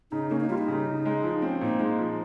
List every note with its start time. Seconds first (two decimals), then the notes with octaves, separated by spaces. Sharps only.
0.11 C#3 D#4
0.30 A#3 C#4
0.40 D#4
0.49 G3 F4
0.58 D#4
0.68 C#3
0.87 C#3
1.05 G#3
1.24 F3
1.42 C4 C#4
1.61 A#2 D#4
1.79 G#3 D#4
1.99 F3